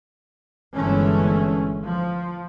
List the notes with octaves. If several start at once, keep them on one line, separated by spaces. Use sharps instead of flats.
G1 E3 G#3 A3 C#4
F3